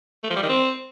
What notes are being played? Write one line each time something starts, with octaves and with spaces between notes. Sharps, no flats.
A3
F3
G3
D#3
C4